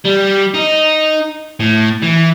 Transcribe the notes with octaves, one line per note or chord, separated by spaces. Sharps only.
G3
D#4
A2
E3